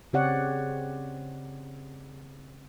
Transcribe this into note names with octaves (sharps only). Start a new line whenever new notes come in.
C#3 C4 G4 C#5 D5 F#5